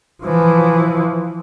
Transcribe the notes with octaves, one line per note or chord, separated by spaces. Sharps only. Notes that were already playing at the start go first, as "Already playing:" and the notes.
E3 F3